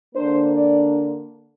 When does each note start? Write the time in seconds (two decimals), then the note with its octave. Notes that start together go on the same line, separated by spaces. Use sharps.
0.15 D3 A#3 D4 C5
0.52 D5